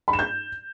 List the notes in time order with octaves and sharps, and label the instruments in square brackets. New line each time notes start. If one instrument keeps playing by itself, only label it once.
[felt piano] B5
E7
G6